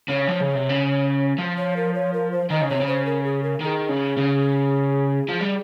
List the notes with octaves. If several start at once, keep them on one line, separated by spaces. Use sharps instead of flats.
C#3 C#5
F3
C#3
C3
C#3
F3
C#5
A#4
C#5
A#4
C5
D#3 D#5
C#3
C3 C#5
C#3
C5
A#4
G#4
A#4
D#3 G#4 A#4
C#3
C#3
F3
G3